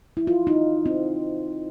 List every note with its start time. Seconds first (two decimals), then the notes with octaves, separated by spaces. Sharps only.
0.17 E4
0.27 F4
0.47 D#4
0.86 C4